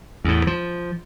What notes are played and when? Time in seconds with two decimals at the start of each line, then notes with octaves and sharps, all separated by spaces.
0.24 E2 A2
0.47 F3